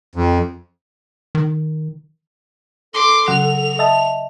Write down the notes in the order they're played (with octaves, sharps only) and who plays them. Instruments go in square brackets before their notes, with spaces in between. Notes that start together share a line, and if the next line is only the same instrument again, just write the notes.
[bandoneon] F2
[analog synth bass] D#3
[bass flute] A4 [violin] C6 D6
[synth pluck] C#3 F#3 F#5 [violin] F7
[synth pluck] D#5 E5 A5